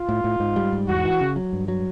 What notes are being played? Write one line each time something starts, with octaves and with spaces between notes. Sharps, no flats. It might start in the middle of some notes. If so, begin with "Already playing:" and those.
Already playing: F4
A2
A2
G#2
G3
G#2
E2 F#4
E3
C#3
F#3
G2
F#3